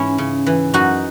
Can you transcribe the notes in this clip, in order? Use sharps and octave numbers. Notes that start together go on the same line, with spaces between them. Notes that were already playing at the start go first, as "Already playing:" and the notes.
Already playing: G#2 E3 C#4 E4
C#3
E3
F#2 D#4 F#4